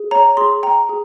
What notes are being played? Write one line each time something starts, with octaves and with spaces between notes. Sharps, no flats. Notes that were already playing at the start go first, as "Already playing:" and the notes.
Already playing: G#4
C#5 A#5
G#4 C6
G5 A#5
G#4